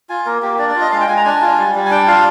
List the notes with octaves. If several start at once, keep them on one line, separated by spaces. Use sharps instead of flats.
F4 G#5
A#3 A#4
A#3 G4
D4 D5
D5
F4
D#5
G#3 F5
G5
G#3 G#5
A#5
D4 G#5
F4
G3
G3
G#5
D4 G5
F4 F5